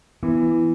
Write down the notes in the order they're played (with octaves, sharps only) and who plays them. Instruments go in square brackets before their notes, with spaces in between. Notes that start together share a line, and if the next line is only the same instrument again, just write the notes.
[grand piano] E3 [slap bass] B3